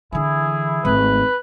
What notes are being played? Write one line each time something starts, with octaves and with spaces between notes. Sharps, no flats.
D3 E3 E4 G#4
G#1 A3 B4